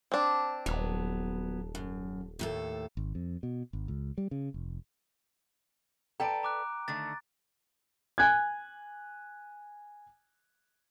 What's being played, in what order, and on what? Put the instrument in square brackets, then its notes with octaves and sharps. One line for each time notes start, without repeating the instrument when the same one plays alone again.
[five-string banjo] C4 D4
[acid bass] D#1 [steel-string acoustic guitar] F#3 B3
[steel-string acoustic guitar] F#2
D#2 A2 A4
[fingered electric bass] G#1
F2
B2
G#1
C#2
G3
C#3
F1
[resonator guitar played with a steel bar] A4 B4 D5 [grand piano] G5 [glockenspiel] A#5 D7
[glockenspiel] A#5 D6 F#6
[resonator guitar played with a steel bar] D3 D#3 A3 [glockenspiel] A6
[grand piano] G#5 F#6 G#6